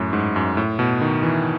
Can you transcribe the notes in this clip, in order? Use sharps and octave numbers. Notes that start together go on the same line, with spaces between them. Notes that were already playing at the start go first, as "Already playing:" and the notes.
Already playing: F#2 A2
G#2
F#2
A2
B2
D#3
E3